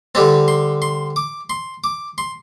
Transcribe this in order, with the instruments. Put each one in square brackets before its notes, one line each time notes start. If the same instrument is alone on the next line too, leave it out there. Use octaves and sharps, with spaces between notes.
[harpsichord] D3 G3 C4 A5
C6
C6
D6
C6
D6
C6